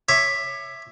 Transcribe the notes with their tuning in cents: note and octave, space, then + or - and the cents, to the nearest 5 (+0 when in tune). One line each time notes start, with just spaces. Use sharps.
C#5 +0 E5 +0 D6 +30